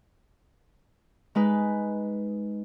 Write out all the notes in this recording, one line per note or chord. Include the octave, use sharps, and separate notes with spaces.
G#3 D#4 B4